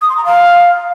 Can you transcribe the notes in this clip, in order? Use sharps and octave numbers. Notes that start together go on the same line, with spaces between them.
D#6
C6
A#5
F5